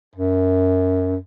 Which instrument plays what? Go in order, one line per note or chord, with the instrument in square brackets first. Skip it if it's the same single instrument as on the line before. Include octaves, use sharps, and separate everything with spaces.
[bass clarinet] F#2